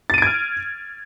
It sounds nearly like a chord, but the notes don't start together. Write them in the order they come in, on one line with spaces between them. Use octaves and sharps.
A6 D#7 D7 G#6 F6